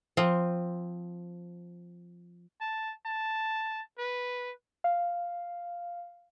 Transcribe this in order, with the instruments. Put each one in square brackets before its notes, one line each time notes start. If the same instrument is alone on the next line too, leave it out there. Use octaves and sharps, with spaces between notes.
[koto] F3 C4
[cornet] A5
A5
B4
[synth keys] F5